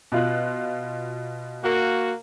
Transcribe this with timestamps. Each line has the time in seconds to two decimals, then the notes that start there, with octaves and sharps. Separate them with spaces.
0.12 B2 F4 F#6
1.63 A#3 F#4